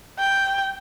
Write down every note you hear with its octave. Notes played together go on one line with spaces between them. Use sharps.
G5